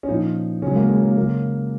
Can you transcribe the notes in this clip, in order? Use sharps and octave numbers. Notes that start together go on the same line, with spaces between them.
C#4
A#2 F3 D#4
C#3 F#3 C#4
G#3
A#3
G#3
A#3
C#3 F#3 A#3